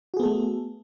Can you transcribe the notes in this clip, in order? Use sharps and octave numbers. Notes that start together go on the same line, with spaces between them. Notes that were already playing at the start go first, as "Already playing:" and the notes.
A3 B3 F#4 G#4 A4